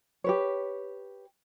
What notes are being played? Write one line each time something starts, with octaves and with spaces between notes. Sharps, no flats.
G4 B4 C#5